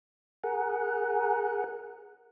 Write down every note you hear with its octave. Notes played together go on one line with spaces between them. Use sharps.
G#4 A#4 F#5